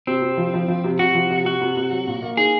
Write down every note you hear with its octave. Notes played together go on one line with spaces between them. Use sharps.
C3 C4
C3
F3
F3
F3
C3
C3 F#4
F3
C3
C3 F#4
C3
C3
F#3
A#2
A#3
D#4 G#4